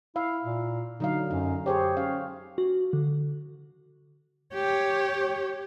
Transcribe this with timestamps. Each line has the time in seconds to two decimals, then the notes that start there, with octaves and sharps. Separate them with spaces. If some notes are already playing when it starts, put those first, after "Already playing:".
0.16 E4 F5
0.44 A#2
1.00 D3 F#3 D#4 F5
1.31 F#2 D#4
1.66 G4 G#4 C5 C#5
1.97 C#4 F5
2.58 F#4
2.93 D3
4.54 G4 C#5